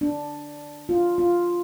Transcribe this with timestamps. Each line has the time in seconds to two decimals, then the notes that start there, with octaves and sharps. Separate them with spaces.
0.01 D4
0.89 F4
1.18 F4